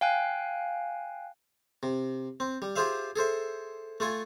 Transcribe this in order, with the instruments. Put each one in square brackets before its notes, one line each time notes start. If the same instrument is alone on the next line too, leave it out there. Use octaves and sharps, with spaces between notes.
[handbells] F5 G5 G#5 F#6
[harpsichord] C3
C4
G3
F4 G4 G#4 C5 E5 F5
G#4 A4 C5 E5
A3 F4 A4 G#5